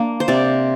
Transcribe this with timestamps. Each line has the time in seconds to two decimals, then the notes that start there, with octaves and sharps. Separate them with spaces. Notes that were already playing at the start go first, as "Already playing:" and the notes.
Already playing: A#3 D4
0.20 C5
0.28 C3 D5